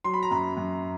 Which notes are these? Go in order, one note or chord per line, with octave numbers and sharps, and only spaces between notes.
F#3 C6
B5
A#5
F#2 B5
F#2